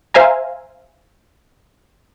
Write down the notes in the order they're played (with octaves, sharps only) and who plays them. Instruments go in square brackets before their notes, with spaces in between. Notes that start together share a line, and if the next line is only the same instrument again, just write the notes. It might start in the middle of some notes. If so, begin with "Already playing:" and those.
[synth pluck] C5 E5 F5 G#5 A#5